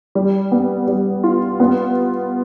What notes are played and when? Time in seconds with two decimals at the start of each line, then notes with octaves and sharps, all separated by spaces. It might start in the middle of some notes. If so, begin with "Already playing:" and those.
0.15 G3
0.52 B3
0.88 G3
1.24 F4
1.60 B3